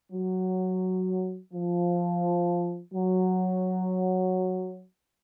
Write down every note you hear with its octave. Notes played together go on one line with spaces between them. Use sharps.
F#3
F3
F#3